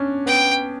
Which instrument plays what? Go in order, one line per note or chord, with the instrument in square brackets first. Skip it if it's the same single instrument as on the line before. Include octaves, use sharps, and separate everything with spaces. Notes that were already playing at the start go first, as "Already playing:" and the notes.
Already playing: [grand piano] C#4 D4
[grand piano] B3 [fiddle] G5